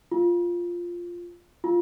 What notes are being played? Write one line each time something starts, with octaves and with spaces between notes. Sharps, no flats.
F4
F4